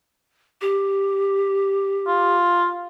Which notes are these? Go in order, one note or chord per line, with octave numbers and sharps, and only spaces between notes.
G4
F4